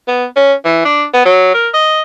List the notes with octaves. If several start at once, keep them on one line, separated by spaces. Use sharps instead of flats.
B3
C#4
E3
D4
B3
F#3
A#4
D#5